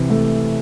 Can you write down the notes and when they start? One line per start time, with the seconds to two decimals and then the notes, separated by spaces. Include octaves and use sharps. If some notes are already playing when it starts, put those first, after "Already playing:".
Already playing: C3 E3
0.10 A3